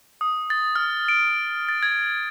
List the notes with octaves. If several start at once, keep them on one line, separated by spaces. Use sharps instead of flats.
D#6
A6
F6
D7
A6
G#6